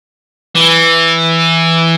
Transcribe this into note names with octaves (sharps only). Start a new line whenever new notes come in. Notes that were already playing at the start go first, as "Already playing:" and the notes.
E3